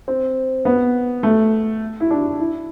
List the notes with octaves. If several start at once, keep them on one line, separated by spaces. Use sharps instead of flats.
C4
B3
A3
E4
D4
E4